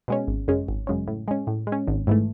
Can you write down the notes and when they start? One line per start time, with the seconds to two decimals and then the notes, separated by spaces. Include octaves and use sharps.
0.08 B2 G#3 C#4
0.28 G#1
0.48 F#2 C#3 G#3 C#4
0.68 G#1
0.87 F#2 C#3 G#3 C#4
1.08 A2
1.28 G#3 C#4
1.47 A2
1.67 G#3
1.72 C#4
1.87 G#1
2.07 G#2 E3 A3